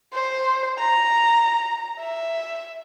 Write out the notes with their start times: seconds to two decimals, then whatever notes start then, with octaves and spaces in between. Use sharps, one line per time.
0.14 C5
0.79 A#5
2.00 E5